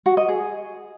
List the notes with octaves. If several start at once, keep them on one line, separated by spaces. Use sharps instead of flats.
F#4
D#5
G#4